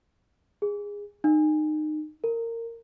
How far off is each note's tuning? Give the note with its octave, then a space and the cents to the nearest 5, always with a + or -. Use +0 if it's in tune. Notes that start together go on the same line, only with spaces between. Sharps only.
G#4 -20
D#4 -25
A#4 -20